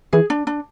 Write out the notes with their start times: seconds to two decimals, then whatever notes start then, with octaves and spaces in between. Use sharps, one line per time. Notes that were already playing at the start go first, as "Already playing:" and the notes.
0.13 E3 G#4
0.30 D4
0.47 D4